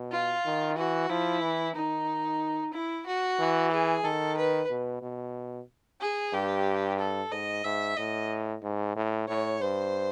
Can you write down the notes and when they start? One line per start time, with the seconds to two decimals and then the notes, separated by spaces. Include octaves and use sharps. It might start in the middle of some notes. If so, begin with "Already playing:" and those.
Already playing: B2
0.12 F4
0.45 D#3
0.77 E3 F#4
1.10 F3 E4
1.42 E3
1.75 D#3 D#4
2.73 E4
3.06 F#4
3.39 E3
3.72 G#4
4.04 D#3 A4
4.37 B4
4.69 B2
5.02 B2
6.01 G#4
6.33 G2 G4
6.99 A4
7.31 G#2 D#5
7.64 G#2 E5
7.97 A2 D#5
8.63 G#2
8.96 A2
9.28 A2 C#5
9.61 G2 C5